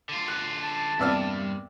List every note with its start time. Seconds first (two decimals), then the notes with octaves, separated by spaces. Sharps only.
0.09 D3 F4
0.28 F#6
0.61 A5
0.99 E2 G2 C3 A#3 D5 E6 F6